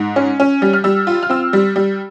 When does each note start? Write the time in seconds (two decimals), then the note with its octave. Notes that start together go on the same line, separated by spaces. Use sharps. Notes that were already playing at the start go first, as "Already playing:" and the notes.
Already playing: G#2
0.16 C#4
0.40 C#4
0.62 G3
0.73 F6
0.84 G3 E6
1.07 F4
1.23 F6
1.30 C4 E6
1.53 G3
1.76 G3